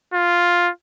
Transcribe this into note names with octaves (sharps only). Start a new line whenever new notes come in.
F4